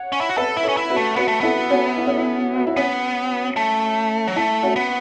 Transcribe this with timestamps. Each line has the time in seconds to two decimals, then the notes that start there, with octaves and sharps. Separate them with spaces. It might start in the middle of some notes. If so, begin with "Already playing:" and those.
Already playing: C#5 F#5
0.12 C#4
0.21 E4
0.29 F#4
0.37 A4 B4 E5
0.57 E4
0.63 A4 C#5
0.69 C#4
0.77 E4
0.90 F#4 B4
0.96 A3
1.16 B3 F#4 B4
1.28 A3
1.41 B3 E4 A4
1.70 C#4 F#4
1.97 E4
2.07 C#4
2.17 E4
2.56 F#4
2.67 E4
2.76 B3 C#4
3.57 A3
4.28 F#3
4.36 A3 E4
4.63 C#4 F#4
4.76 B3